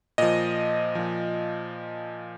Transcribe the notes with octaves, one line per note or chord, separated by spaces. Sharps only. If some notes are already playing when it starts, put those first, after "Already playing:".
A#2 F3 D#5
A#2 F3